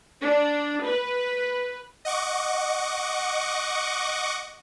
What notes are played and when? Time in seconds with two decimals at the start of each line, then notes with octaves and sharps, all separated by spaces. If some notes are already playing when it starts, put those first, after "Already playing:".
0.22 D4
0.86 B4
2.05 D#5 F#5 C#6 D6